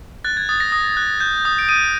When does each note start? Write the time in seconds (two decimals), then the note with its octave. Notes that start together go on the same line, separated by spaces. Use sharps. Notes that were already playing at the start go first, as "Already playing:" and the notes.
0.24 F#6 A6
0.37 G#6
0.49 D#6 A6
0.60 A#6
0.72 D#6
0.97 F#6
1.20 G6
1.45 D#6
1.59 D7
1.69 D#6 D#7